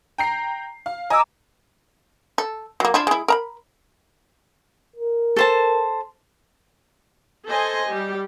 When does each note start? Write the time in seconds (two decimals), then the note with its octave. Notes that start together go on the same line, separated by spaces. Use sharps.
0.18 G5 A#5 C7
0.86 F5
1.10 D#5 G#5 A#5 D6 E6
2.38 A4
2.80 F#3 A#3
2.94 D4 E4 F4
3.07 G#3 E4
3.28 A#4 A#5 B5
4.96 A#4
5.37 A4 C5 A5
7.46 A4 C5 D#5 G#5
7.88 G3 G4